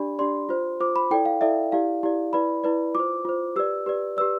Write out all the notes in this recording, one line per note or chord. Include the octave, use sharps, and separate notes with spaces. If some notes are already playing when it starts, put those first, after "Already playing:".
Already playing: D4 G4 D5 B5
D4 G4 D5 C6
F4 C5
F4 C5 D6
B5
E4 A4 D5 G5
F5
E4 A4 D5 E5
E4 G4 D5 F5
E4 G4 D5
E4 B4 D5 B5
E4 B4 D5
F4 C5 D6
F4 C5
G4 B4 D5 E6
G4 B4 D5
G4 B4 D5 E6